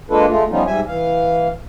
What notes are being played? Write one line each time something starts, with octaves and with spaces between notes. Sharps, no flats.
G#3 A#3 D4 F4 A4 B4
G#3 A3 F4
F3 G3 B3 C#4 D#4 F4
G#2 G3 E5 G#5
E3 F5